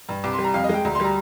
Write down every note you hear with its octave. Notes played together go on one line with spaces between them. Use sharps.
G2
C2 D6
C6
G3
A#5
F2 F5
D#5
G#3 G5
D2 A#5
C6
G3 A#5